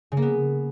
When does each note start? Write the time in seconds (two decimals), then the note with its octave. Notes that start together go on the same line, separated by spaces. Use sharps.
0.12 C#3
0.17 A#3
0.22 B3